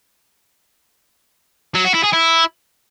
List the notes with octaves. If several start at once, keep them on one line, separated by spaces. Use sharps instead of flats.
F#3
F#4
E4
G#4
E4